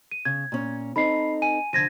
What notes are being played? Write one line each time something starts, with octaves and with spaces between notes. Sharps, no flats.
D#7
C#3 G#6
A#2 C#4
C4 D#4 A4 B5 C7
G#5 D#7
D3 F3 G#6 A#6 D#7